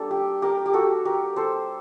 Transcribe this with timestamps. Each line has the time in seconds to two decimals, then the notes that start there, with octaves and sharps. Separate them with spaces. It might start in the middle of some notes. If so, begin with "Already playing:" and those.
Already playing: G3 A#3 D4 A4
0.11 G4
0.42 G4 A#4
0.66 G4
0.73 F#4 A4
1.05 G4 A#4
1.36 A4 C5